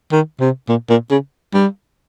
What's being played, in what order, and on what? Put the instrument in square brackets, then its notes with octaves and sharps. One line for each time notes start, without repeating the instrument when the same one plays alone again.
[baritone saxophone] D#3
C3
A#2
A#2
C#3
G3